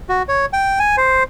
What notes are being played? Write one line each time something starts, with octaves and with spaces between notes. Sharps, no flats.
F#4
C#5
G5
G#5
C5